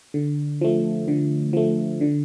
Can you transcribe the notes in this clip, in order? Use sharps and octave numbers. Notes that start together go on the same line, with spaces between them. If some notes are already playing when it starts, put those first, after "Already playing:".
D3
F3 A3
D3
F3 A3
D3